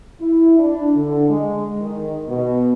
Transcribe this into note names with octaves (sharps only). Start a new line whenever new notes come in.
E4
D4
D3
G#3
D#3
B2